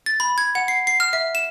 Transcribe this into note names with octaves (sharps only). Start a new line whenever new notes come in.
A6
B5
G#6
F#5
C7
C7
F6
E5
E7